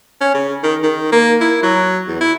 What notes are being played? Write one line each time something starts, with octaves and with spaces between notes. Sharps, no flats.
C#4
C#3
D#3
D#3
A#3
E4
F#3
E2
E4